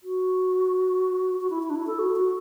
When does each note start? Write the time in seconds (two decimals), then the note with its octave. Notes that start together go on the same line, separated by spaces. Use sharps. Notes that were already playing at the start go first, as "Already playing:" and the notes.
0.03 F#4
1.41 F#4
1.50 E4
1.63 E4
1.70 D4
1.75 E4
1.87 A4
1.99 F#4
2.16 F#4